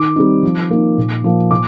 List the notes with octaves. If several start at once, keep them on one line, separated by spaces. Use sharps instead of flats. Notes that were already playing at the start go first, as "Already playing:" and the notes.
Already playing: D#3 D6
G3 C4 D#4
F3
A#3 D#4
A#2
F3 A#3
A#2 D6